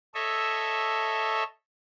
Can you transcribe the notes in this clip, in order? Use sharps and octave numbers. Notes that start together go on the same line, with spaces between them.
A4 C#5 D#5 E5